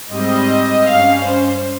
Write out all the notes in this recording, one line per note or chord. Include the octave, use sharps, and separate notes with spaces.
G#2 G3 C4 D#5
G2 G3 C#4 F5
C5